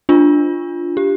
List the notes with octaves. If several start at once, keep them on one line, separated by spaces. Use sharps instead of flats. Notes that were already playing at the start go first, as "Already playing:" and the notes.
D4 F4
G4